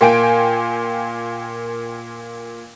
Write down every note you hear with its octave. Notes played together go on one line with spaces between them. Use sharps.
A#2 A#3 G5 G#5 D7